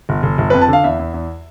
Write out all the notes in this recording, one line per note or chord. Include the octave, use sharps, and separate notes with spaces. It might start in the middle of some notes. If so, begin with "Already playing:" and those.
G1
G1
G1
F2 B4
A5
D3 F5
E2 E5
E2
E2